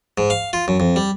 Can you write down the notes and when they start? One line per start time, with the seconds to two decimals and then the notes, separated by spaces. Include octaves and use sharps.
0.18 G#2
0.30 F5
0.53 F4
0.68 F#2
0.80 F2
0.96 G3